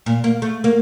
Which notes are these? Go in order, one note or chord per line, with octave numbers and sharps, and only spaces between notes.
A#2
A#3
A3
A#3